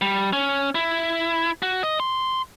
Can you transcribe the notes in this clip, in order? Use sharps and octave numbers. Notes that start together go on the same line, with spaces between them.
G3
C#4
E4
F#4
D#5
C6